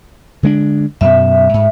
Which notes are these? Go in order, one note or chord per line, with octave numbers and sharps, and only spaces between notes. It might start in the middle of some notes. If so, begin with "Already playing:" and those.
D3 G#3 D4
F#2 B2 E5
G#2